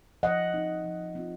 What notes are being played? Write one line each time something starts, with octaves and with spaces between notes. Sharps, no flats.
F3 D#5 F#5
C4 D#4
F3
C4 F4